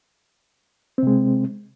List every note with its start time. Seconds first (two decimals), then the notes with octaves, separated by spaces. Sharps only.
0.98 C4
1.03 C3
1.07 G#3